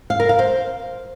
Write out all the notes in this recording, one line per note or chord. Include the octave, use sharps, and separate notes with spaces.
F5
A#4
F5
C5